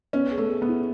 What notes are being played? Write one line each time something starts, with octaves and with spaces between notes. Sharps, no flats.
B3 C#4
G#4
A3
G#4
B3
E4